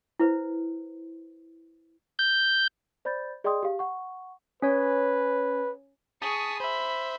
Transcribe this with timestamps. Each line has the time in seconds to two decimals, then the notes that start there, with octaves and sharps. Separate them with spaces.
0.20 E4 B4 C5
2.19 G6
3.05 C5 D5 B5 G6 A6
3.44 G#4 D5 D#5 G5 C6 D#6
3.63 G4 F5
3.79 F#5 C#6
4.62 C#4 B4 C#5
6.22 G#4 A5 C#6 D#6 B6
6.60 C5 E5 B5